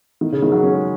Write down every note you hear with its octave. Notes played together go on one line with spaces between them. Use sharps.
D#3
C#3
D#3
F#3
C#4
G#3